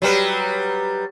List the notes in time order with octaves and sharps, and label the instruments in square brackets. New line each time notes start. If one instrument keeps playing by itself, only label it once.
[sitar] F#3 G3 B4